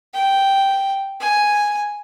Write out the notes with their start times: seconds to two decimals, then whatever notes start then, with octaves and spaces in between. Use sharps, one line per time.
0.14 G5
1.20 G#5